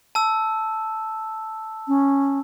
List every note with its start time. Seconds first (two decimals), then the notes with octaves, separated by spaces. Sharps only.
0.15 A5 E6
1.88 C#4